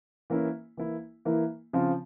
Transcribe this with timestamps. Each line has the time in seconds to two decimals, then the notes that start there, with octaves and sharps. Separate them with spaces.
0.30 E3 A#3 C#4 E4
0.77 E3 A#3 E4
1.25 E3 A#3 E4
1.73 C#3 F3 C4 F4